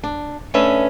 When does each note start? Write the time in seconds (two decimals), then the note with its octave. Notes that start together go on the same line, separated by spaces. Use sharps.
0.04 D4
0.54 A3 C#4 D4 B4 E5